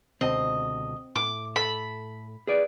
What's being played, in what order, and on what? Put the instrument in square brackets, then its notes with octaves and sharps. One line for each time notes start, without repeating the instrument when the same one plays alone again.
[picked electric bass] C#2 B2 D3 [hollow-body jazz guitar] C4 [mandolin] D#5
[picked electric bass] A2 [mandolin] D6
[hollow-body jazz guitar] A4 [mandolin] B5
[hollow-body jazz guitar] G#4 B4 D5